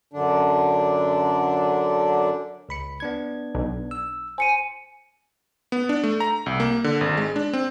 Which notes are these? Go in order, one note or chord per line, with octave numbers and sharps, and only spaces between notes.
F#2 D3 D4
C#2 B5 C#7
B3 D4 G#6
B1
E6
C5 G#5 C#7 D#7
B3
D4
A3
A#5
C2
A#3
D3
G#1
G#3
D4
C4